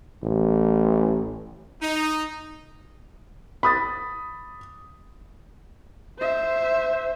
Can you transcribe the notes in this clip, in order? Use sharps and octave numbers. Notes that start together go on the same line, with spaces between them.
A1
D#4
B5 D#6 A6
C5 E5